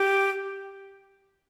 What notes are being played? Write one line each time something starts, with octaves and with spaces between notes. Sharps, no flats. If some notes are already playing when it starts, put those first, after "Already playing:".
Already playing: G4